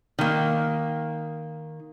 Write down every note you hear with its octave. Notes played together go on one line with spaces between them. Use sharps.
D#3 A#3